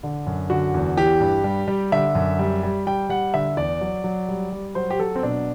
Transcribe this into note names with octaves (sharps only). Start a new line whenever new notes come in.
D3
F#2
D3 F#4
E2
E3 G4
G2
G3
G3
D3 E5
F#2
G3
G3
G3 G5
G3 F#5
D3 E5
E2 D5
F#3
F#3
G3
G3
F#3 C5
G4
F#3 A4
C4
B2 D4